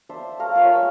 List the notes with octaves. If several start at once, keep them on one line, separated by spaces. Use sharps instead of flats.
D4 C5 E5
A3 F5 A#5
F4 A#4 C#5
G#3 G#5 E6